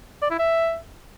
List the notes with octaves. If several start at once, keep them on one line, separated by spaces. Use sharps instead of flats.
D5
E4
E5